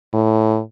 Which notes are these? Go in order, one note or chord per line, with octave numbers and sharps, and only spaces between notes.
A2